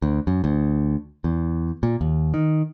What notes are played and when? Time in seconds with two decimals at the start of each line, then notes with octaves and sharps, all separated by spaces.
0.02 D2
0.27 F#2
0.44 D2
1.24 E2
1.83 A#2
2.01 D#2
2.34 D#3